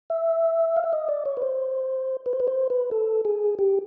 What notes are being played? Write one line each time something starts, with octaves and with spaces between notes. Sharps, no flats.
E5
F5
E5
D#5
D5
C#5
B4
C5
B4
C5
B4
C5
B4
A4
G#4
G4